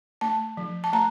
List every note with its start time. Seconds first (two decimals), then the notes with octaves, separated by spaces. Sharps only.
0.21 A3 A5
0.57 F3
0.84 A5
0.93 A3 A#5